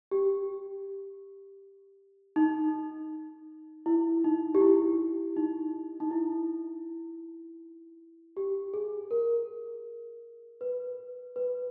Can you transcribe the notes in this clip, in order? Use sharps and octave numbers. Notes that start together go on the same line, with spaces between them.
G4
D#4
E4
D#4
G4
E4
D#4
D#4
E4
G4
G#4
A#4
B4
B4